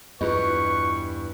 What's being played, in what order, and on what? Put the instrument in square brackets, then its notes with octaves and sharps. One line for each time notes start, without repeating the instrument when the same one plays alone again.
[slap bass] E2 G2 [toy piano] F4 G4 D#5 [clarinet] B4 [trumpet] C#6